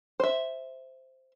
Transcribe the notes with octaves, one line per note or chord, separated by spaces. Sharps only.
C5 E5